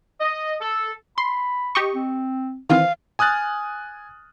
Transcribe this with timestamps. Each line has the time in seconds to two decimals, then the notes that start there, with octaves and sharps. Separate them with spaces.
0.21 D#5
0.60 A4
1.18 B5 C6
1.75 G4 D#5 C#6
1.95 C4
2.70 D#3 E3 C4 F5
3.19 G#5 D#6 F6 F#6 A6